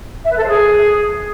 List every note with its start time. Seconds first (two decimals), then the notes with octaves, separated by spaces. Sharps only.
0.24 E5
0.30 B4
0.36 A4
0.42 C5
0.48 G#4